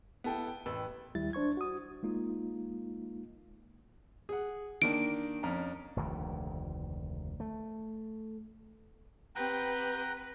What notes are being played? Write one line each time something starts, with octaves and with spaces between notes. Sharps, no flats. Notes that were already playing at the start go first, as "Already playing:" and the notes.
B3 E4 A4 G5
G5
A1 B4 E6
D#2 G3 E4 A6
D4 C5 C#6 G#6
F#4 D#6
G#3 A#3 D#4 F4
G#4 F#5
D#3 A#3 D4 D7
F2 C#4 A#5
F1 D2 A#2 D#3
A3
C4 G4 B4 F#5 G5 A#5